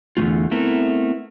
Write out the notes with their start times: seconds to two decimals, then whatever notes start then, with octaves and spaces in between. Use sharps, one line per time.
0.17 E2 D3 D#3 A3 F4
0.51 A3 B3 C4 E4 A4 A#4